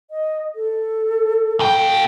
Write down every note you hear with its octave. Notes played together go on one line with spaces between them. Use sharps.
D#5
A4
B2 G5